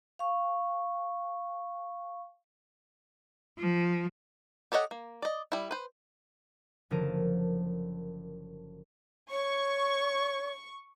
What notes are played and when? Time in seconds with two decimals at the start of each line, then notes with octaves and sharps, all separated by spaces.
0.19 F5 C#6
3.59 F3
4.72 G4 A4 C#5 D#5 F#5
4.91 A#3
5.22 D5 D#5
5.52 G3 E4
5.71 B4 C5
6.91 F#1 D3 F3 A#4 A5 D#7
9.31 C#5 C#6